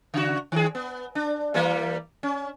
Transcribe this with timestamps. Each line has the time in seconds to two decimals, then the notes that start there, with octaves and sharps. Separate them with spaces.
0.14 C#3 F#4
0.52 D#3 G#4
0.75 B3
1.15 D4
1.54 E3 G3 A#3
2.23 C#4